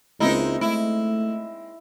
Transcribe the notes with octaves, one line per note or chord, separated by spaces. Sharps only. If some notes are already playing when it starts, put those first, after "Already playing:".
C#2 G#3 A#3 C4 D#4 E4
A3 E4